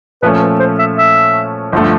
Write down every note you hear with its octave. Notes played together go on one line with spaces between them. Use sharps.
A#2 F3 A3 C#4 B4
B4
C5
E5
E5
G1 D3 F3 A3